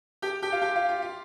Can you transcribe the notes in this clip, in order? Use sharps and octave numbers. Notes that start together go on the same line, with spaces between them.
G4 G5
G4 G5
F4 F5
G4 G5
F4 F5
F4 F5
F4 F5